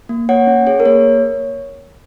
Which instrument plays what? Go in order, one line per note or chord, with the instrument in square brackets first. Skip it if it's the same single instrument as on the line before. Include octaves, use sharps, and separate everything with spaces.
[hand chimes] A#3
A#3 C#5 F#5
C#4
G#4 C#5
A#4
A#3 C#5